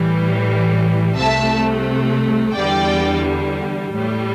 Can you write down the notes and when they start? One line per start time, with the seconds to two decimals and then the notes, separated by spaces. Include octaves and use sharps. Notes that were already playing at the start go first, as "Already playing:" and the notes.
Already playing: A2 E3 G3
1.17 C2 C3 A3 E5 A5
2.54 E2 D3 G3 D5 G5
3.91 A2 G3